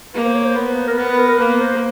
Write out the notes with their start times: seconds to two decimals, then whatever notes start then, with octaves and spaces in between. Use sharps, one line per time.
0.14 A#3 B4
0.24 C5
0.35 C#5
0.46 C5
0.55 B3
0.66 B4
0.77 B4
0.87 A#4
0.97 B3 B4
1.08 B4
1.18 A#4
1.29 A#4
1.39 A#3 B4
1.61 C5